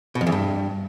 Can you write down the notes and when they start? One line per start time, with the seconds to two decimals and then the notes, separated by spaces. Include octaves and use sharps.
0.15 B2
0.21 F2
0.27 E2
0.32 G2